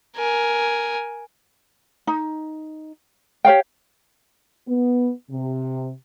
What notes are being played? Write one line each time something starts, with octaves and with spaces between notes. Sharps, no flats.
A#4 G#5
D#4
G4 C#5 F5 G5
B3
C3